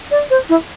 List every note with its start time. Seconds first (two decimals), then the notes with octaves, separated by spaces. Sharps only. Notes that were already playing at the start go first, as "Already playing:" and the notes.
0.11 D5
0.30 C5
0.49 E4